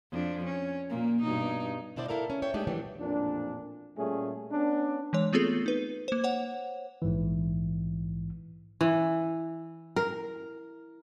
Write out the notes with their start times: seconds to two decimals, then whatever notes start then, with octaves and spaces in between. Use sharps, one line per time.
0.12 F2 D4
0.45 C#4
0.90 A#2 A#3
1.21 G2 B2 D#4
1.96 B2 D4 E4 C5 D5
2.08 E4 A4 A#4 F5
2.30 C#4
2.42 C#5 E5 G5
2.54 G#3 A3 D4 D#4 G4
2.67 D#3 E3 F#3 A3 D4 G4
3.00 A1 F2 A#2 D4
3.97 A#2 G3 A3 C#4 G#4
4.52 B3 C#4 D4
5.13 E3 G#3 C#5
5.33 A3 B3 C4 F4 G#4 A4
5.66 D#4 B4
6.08 A#3 C5
6.24 C5 C#5 F#5
7.02 A#1 G#2 E3
8.81 E3
9.96 A#4